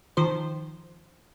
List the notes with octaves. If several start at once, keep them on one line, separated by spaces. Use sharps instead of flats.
D#3 F3 C5